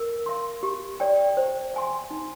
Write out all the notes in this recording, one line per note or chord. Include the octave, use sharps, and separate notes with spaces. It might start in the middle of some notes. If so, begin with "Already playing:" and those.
Already playing: A#4
F5 C6
G4
D5 G5
C5
F5 G#5 C6
D#4